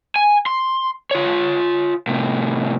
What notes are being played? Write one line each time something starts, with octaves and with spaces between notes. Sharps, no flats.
G#5
C6
F4 C#5
A2 C3